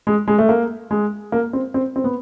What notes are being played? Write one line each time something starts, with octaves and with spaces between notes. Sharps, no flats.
G#3
G#3
A3
A#3
G#3
A#3
C4
C4
C4
B3